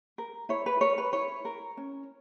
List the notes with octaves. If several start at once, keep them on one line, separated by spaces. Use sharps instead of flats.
A#4
E4 C#5
B4
A#4 C#5
B4
E4 C#5
A#4
C#4